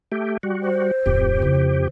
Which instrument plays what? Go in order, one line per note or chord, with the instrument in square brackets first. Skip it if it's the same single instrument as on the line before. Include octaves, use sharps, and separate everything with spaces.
[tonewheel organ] A3 G4
G3 F#4
[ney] C5
[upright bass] D1 [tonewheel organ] F2 G4
[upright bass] C#3 E4